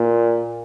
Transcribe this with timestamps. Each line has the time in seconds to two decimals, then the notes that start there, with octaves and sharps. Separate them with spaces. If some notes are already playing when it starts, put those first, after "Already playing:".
Already playing: A#2